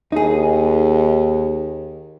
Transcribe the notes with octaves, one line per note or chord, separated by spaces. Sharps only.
D#2 D#4 G#4